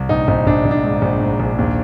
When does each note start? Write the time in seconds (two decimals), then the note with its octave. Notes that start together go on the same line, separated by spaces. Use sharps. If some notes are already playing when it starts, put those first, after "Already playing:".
Already playing: C2
0.09 A#1 D#4
0.28 A#1 D#4
0.47 A#1 D4
0.65 A#1
0.71 D4
0.83 G#2
1.02 A#1
1.20 G#2
1.40 A#1
1.58 D#2